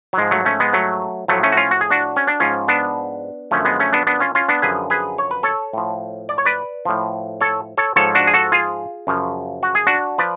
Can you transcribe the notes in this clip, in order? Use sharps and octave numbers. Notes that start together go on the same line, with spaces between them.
F#3
G#2 F3 G#3
F#3 A3
A3 C#4
G#3 B3
F#3 A3
A2 F3 F#3 A3
A3 C#4
F#4
C#4 F4
F#4
G#4
D4 F#4
C#4
D4
G#2 F3 C#4 F4
B3 D4
F#2 D3 F3 A3 C#4
G#3 B3
A3 C#4
B3 D4
B3 D4
C#4 F4
C#4 F4
B3 D4
F#2 D3 F3 G#4 B4
G#4 B4
C#5
B4
A4 C#5
A2 F3
D5
C#5
B4 D5
A2 F3
A4 C#5
A4 C#5
G#2 F3 A4 C#5
D4 F#4
G#4
F#4 A4
F4 G#4
F#2 C#3 F3
F#4
G#4
D4 F#4
F3 B4 D5